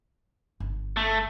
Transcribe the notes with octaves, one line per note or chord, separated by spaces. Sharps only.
G1
A3